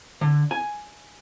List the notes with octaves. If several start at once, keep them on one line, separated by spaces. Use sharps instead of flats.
D3
G#5